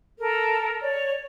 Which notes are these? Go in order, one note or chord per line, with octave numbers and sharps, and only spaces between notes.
A4 A#4
C#5 D5